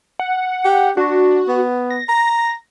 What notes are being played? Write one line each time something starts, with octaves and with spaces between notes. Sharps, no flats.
F#5
G4
D4 F#4
B3
A#6
A#5 A#6